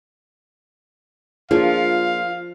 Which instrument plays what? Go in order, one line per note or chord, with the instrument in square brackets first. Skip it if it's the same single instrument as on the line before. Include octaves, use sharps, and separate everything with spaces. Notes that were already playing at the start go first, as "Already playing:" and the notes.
[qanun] F3 [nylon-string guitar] A#3 D4 G#4 [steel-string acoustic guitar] F4 [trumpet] F5